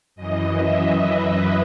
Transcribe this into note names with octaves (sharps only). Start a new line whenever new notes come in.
F#2 E3 D#5
E5
B4